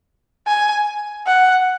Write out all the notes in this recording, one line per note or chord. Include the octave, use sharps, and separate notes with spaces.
G#5
F#5